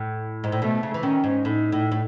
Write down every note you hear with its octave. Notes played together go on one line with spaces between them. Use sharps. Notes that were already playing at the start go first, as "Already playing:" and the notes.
Already playing: A2
G#2
A2
B2 A3
C#3
E3
D#3 C#4
G#2
A2 D#4
A2
A2